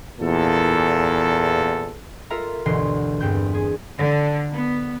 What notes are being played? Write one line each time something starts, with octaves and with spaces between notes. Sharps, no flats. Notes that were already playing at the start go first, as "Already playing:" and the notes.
E2 A#2 A4
F4 A4 A#4 E5 A#5
G1 D2 B2 E3 C6 C7
E2 G2 C4 G6
G#4
D3
B3